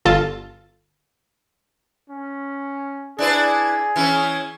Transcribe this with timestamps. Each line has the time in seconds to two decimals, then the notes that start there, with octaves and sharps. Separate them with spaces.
0.05 G1 F4 A4 A5
2.10 C#4
3.19 D4 E4 G#4 B4
3.96 E3 C#4